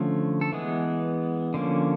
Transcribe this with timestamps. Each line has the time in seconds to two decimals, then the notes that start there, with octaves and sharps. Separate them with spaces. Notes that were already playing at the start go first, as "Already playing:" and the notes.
Already playing: D3 F3 A3 C#4
0.41 A4
0.53 E3 G#3 B3 G#4
1.54 D3 F3 A#3 C#4